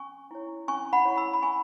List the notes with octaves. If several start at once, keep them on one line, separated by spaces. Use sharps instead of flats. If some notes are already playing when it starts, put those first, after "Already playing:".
Already playing: C#4 G#5 C#6
E4 C#5
C#4 G#5 C#6
F#5 B5
E4 C#5
B5 E6
B5
C#4 G#5 C#6